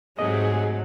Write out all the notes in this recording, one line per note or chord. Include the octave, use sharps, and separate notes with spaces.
G#2 C3 F#3 A3 G#4 D#5